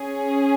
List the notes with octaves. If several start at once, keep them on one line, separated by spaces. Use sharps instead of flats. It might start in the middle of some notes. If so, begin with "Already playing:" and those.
Already playing: C#4 G#4